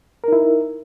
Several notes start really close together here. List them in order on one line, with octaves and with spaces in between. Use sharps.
A#4 D#4 E4